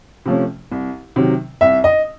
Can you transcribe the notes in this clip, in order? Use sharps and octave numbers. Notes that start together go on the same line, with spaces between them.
C3 F3 A3 C#4
C2
C3 D#3 F#3
C2 E5
D#5